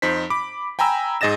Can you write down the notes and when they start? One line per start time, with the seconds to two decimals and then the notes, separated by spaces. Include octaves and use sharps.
0.02 F2 D#4 C5 B6
0.30 B5 D6
0.79 G5 G#5 A#5 B5 E6
1.21 G#2 G#4 D#5 A6 A#6 E7